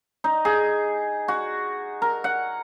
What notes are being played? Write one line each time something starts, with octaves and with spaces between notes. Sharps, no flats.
D#4
G#4
F#4
A#4
F#5